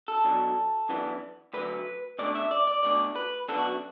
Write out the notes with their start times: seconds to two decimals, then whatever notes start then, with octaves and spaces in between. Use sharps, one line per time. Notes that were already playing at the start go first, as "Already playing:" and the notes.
0.08 A4
0.24 B2 F#3 D4
0.89 F#2 E3 B3 D4
1.53 D2 D3 F#3 B4
2.19 B2 A3 D4 D5
2.35 E5
2.51 D5
2.67 D5
2.83 B2 A3 D4 D5
3.16 B4
3.48 F#2 D3 B3 D4 A4
3.58 F#4